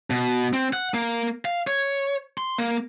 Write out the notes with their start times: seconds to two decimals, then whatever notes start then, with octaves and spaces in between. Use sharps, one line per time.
0.10 B2
0.53 C4
0.73 F#5
0.94 A#3
1.45 F5
1.67 C#5
2.38 C6
2.58 A#3